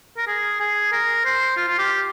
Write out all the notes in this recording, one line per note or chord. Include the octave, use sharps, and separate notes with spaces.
A#4
G#4
G#4
A#4
C5
F4
F4
G4